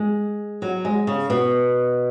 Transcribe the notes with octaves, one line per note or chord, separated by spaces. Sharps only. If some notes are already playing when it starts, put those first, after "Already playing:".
Already playing: G#3
F#3
G#3
C#3
B2